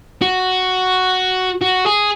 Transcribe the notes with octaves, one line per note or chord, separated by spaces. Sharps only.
F#4
F#4
G#4